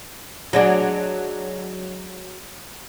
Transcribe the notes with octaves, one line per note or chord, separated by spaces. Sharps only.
F#3 G#3 D4